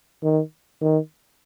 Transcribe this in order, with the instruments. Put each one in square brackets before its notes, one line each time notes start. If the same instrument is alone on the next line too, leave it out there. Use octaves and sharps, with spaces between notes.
[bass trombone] D#3
D#3